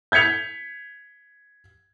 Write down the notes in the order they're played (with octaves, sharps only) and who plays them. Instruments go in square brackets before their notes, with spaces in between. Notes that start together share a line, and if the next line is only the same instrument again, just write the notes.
[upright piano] G6 G#6 B6 C#7 F7